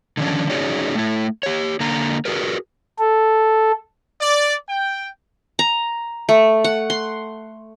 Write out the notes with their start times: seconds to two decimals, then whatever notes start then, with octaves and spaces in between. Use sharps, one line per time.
0.17 D3 D#3 F3 A#3 C#4 D4
0.50 C#4 D#4 F#4 G#4 C#5 D5
0.95 A3 E4
1.43 G4 C#5
1.80 D3 A#3 A#5
2.25 F#4 G#4 A#4 B4
2.99 A4
4.20 D5
4.69 G5
5.59 A#5
6.29 A3
6.64 F#5
6.90 C6